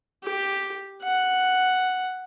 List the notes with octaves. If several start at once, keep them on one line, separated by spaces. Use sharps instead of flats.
G4
F#5